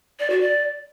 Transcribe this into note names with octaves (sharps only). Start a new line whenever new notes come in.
D5
F#4
D5